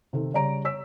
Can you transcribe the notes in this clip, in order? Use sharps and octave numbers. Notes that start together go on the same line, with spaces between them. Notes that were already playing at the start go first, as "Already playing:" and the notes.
C3 D#3 A4
C#3 G3 C#5 D5 A#5 D7
C#5 E6 B6